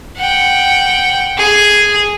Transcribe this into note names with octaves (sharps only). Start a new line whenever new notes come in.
F#5 G5
G#4